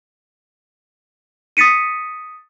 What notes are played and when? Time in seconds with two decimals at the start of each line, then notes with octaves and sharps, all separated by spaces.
1.57 D#6 A6 B6 C#7 D#7